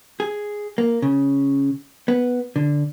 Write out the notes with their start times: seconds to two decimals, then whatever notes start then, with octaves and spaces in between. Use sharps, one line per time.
0.20 G#4
0.78 A#3
1.02 C#3
2.08 B3
2.56 D3